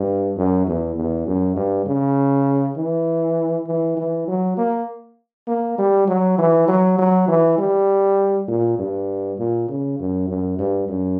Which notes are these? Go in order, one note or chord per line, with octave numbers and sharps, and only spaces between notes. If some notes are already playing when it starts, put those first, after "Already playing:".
Already playing: G2
F#2
E2
E2
F#2
G2
C#3
E3
E3
E3
F#3
A#3
A#3
G3
F#3
E3
F#3
F#3
E3
G3
A#2
G2
A#2
C#3
F#2
F#2
G2
F#2